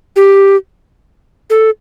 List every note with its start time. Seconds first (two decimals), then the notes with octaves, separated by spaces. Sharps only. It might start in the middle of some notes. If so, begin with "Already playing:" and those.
0.16 G4
1.50 A4